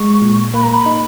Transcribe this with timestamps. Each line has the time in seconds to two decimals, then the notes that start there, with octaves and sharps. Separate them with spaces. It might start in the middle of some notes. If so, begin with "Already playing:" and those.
Already playing: G#3 C#6
0.22 A#2
0.54 A#3 B5
0.63 A#5
0.73 B5
0.86 D#4